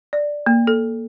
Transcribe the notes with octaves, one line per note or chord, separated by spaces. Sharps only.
D5
A#3
A4